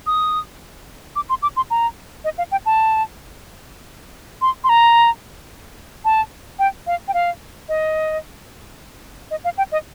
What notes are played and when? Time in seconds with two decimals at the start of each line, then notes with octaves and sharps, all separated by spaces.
0.07 D#6
1.16 D6
1.29 C6
1.42 D6
1.56 C6
1.70 A#5
2.24 D#5
2.38 F5
2.51 G5
2.66 A5
4.41 C6
4.64 C6
4.69 A#5
6.05 A5
6.59 G5
6.87 F5
7.08 G5
7.14 F5
7.69 D#5
9.31 D#5
9.44 F5
9.58 G5
9.72 D#5